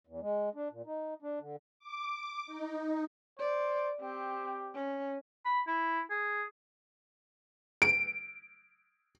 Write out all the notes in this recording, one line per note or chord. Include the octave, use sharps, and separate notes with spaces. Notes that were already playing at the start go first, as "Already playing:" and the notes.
E2
G#3
D4
A#2
D#4
D4
D3
D6
D#4
C5 D5
C4 G4
C#4
B5
E4
G#4
D7